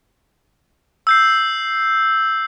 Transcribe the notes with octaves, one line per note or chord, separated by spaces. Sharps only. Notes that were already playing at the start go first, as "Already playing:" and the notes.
E6 G6 C7